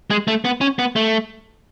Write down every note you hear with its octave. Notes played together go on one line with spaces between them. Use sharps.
G#3
A3
B3
C#4
B3
A3